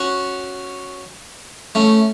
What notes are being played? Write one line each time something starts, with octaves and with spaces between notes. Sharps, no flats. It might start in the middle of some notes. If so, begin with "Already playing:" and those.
Already playing: C#4 F#4
A3 C#4